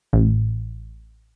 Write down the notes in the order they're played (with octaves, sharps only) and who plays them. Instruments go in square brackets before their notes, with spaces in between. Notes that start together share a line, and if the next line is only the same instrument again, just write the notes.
[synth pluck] A1